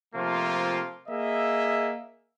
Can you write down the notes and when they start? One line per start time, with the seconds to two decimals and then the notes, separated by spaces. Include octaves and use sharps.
0.15 C3 F3 A3 A#3 F4
1.09 A#3 G#4 D#5 E5